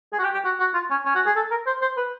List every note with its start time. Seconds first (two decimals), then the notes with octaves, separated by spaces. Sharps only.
0.13 G#4
0.19 F#4
0.23 G4
0.34 G4
0.44 F#4
0.60 F#4
0.74 F4
0.91 C#4
1.05 C#4
1.15 F#4
1.26 G#4
1.36 A4
1.51 A#4
1.66 C5
1.81 C5
1.97 B4